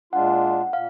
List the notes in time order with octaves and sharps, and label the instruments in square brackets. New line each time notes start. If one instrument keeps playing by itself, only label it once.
[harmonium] A#2 G#3 D4 F4 [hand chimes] F#5
[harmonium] A#2 [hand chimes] F5